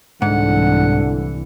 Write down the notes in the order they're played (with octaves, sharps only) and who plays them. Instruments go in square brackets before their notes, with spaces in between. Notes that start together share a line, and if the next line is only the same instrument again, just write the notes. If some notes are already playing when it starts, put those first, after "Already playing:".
[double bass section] C2 E3 [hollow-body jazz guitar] G#2 [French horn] D3 [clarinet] F#5